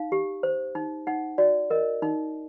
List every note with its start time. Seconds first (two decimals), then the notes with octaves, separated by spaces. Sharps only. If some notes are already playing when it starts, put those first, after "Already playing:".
Already playing: D#4 F5
0.12 G4
0.43 C5
0.75 D#4
1.07 D#4 F#5
1.38 F#4 D5
1.70 A#4 D#5
2.02 D#4